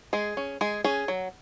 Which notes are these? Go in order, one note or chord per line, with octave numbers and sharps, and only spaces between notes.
G#3 G#4
C#4
G#3 G#4
C#4 G#4
F#3